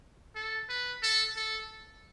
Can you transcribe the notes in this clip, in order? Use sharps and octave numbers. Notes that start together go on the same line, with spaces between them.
A4
B4
A4
A4